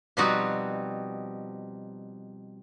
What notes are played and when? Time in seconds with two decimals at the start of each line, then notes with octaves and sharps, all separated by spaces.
0.17 B2 F3 G3 C4 D#4 F#4